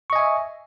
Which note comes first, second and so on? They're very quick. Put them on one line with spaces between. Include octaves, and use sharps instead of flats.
C#6 D#5 G#5 E5